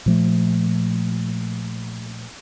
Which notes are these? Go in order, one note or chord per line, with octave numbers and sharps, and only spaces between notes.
A#2 F3 A3